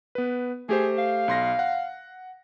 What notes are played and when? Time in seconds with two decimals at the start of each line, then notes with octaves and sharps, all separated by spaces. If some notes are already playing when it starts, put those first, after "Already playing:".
0.15 B3 B4
0.69 A3 G4 G#4 C5
0.98 F5
1.28 B1 C6 A#6
1.59 F#5